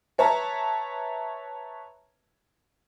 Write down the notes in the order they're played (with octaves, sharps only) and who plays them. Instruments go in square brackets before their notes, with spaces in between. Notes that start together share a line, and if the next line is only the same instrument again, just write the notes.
[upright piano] B4 C#5 E5 A5 A#5